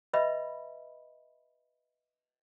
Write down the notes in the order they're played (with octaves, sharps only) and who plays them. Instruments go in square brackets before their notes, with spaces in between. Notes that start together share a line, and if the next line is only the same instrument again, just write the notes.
[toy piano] B4 D#5 E5 B5